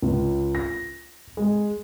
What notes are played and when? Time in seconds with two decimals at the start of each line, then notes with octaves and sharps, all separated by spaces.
0.02 C#2
0.55 A#6
1.37 G#3